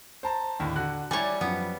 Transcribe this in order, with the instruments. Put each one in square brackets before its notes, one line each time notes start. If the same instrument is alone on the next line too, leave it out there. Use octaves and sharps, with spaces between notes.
[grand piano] C5 A5 A#5
D#2 A2 D3
D3 F#4 F#6
[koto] G3 C#5 [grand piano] E4 D5 G#5
[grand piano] F#2 F3 [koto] B3